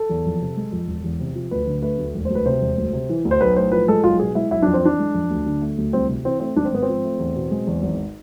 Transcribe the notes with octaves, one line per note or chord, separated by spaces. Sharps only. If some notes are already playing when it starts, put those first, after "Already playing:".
Already playing: A4
E2
F2
C3
G#3
F2
E1
E2
C3
F3
D2 B4
D3
A3 B4
D2
E1
D2 C5
B4
C3 C5
E1
D2
C3
E3
D2
C5
B1 B4
A2 C5
F3 B4
G#3 A4
B1 F4
B2 G#4
G#3 E4
B1 E4
F2 D4
C4
E3 D4
G#3
F2
D2
D3
A3
D2
C2 C4
C3
E3 C4
A3 C4
G#1 D4
C4
G#2 B3
C4
F3
A3
E2
B2
G#3
E2
G#1